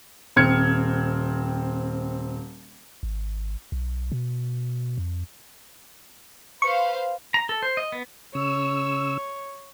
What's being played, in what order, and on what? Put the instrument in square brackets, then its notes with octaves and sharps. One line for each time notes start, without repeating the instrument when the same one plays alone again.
[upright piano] D#1 C4 F6 G#6 C#7
[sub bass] G#1
B1
B2
F2
[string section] B4 C5 F5 [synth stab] C#6
[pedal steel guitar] A#5
A4
C5
D#5
B3
[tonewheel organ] C#3 E6 [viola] C#5